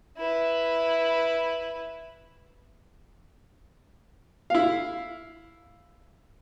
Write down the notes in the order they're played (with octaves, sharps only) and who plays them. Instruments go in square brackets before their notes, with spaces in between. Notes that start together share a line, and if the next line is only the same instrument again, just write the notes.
[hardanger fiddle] E4 B4
[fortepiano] E4 F5